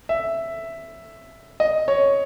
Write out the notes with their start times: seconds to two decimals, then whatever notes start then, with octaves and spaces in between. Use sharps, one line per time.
0.09 E5
1.60 D#5
1.88 C#5